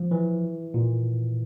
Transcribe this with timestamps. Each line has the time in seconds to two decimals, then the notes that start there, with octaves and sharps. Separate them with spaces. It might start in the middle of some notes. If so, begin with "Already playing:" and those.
Already playing: F3
0.11 E3
0.74 A#2